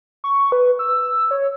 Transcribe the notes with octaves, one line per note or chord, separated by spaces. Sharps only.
C#6
B4
E6
C#5